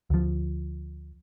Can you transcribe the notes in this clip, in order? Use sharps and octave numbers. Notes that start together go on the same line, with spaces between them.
D2 F3